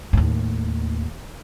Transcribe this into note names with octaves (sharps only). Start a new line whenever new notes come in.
D#2 A2